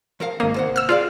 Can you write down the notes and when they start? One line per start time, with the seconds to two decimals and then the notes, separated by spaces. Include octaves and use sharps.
0.20 F3 A#4 F5
0.40 G#1 A#3 D#5
0.54 C2 C5 F#5
0.76 E6 F6
0.89 F4 G#4 D5 F5